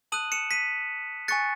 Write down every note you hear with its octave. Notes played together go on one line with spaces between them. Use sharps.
A5 D#6 F#6 D#7 F#7
C#7 E7
B6 D#7
G#5 C#6 F#6 A6 C#7